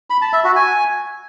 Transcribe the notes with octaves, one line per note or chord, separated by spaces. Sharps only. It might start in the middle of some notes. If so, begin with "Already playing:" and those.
B5
A5
E5
F#4
G#5